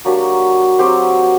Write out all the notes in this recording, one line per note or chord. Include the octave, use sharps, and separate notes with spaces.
F#3 A#3 D4 G4
F#3 C4 G4 C5